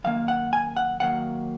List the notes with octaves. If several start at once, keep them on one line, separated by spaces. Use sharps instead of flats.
F#2 D#3 A#3 F5
F#5
G#5
F#5
D#2 D#3 F#3 A#3 F#5